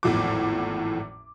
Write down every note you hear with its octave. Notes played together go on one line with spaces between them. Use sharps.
G#1 E2 A2 F3 D6